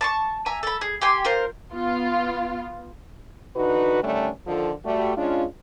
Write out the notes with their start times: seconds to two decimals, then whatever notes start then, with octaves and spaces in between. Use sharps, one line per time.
0.01 A5 C6 C#6
0.46 E5 G#5 A#5
0.63 A4 B5
0.81 G#4
1.01 G4 G5 G#5 C6
1.25 F4 A#4 C5
1.73 B3 F4
3.56 D3 E3 D#4 F#4 B4
4.03 D3 D#3 G3 A3 C#4 D4
4.47 D3 D#3 F3 F4 A4
4.84 G3 A3 F#4
5.16 G#3 C#4 D4 F4